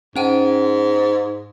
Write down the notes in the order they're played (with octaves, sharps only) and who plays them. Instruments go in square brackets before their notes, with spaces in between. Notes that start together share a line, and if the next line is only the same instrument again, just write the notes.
[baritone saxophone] G#2 [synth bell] C#4 F#5 G5